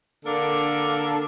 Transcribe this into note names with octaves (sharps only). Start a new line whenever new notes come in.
D3 A#3 D4 A4 A#4